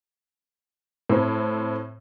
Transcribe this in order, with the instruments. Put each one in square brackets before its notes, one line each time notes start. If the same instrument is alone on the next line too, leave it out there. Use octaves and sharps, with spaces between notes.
[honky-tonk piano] A2 C4